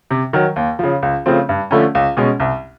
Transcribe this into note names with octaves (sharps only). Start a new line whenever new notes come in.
C3
D#3 F#3
D#2
C#3 F3
C#2
C#3 F3 A3 C4
G2
D3 F3 A3 C#4
C#2
B2 G#3 C#4
C2